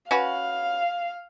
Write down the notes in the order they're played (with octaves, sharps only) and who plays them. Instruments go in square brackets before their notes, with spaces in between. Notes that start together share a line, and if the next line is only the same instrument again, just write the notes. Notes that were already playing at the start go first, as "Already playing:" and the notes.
[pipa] C#4 F#4 B4 [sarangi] F5